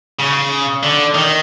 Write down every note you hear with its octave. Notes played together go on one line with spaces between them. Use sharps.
C#3
D3
D#3